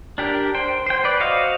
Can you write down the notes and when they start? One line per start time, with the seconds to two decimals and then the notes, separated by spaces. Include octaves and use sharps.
0.18 D4 G4 A#4
0.55 C5 G5
0.86 C5 G5
1.04 B4 D5
1.20 F#4 C5 D#5 F5